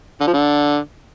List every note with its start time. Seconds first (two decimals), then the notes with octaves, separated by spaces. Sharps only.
0.21 D3
0.27 F3
0.33 D3